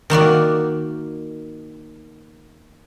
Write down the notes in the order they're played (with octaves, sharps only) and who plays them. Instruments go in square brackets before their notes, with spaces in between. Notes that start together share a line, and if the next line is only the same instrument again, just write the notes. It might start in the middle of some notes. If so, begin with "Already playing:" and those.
[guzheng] D#3 A#3 F#4 D5